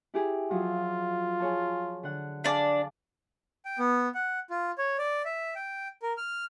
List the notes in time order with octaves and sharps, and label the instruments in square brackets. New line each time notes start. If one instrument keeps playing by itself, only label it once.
[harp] E4 G4 G#4
[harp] F3 F#3 [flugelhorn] F4
[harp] G#4 C#5 A5
D3 F#5
[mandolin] D4 D5 [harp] G#4 F5
[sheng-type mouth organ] G5
B3
F#5
F4
C#5
D5
E5
G5
A#4
F6